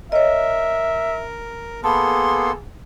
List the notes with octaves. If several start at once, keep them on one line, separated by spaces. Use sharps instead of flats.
A#4 C#5 D#5 E5
A#3 B3 G#4 A4 A5 B5 C6